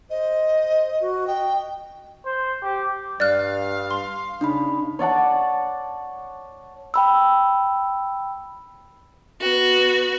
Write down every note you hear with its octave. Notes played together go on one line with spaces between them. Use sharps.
C5 D#5
F#4
D#5 G5
C5
G4
G2 D5 F5 F6 F#6
C6
C#3 D4 D#4 B5
C#5 D5 F#5 A5
G5 B5 E6
B3 F#4